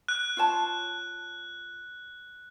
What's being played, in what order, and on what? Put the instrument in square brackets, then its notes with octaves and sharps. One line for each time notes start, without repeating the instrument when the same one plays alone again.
[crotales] F#6
[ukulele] F4 C#5 A5